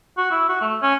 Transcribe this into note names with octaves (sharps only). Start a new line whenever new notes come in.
F#4
E4
F#4
A3
C#4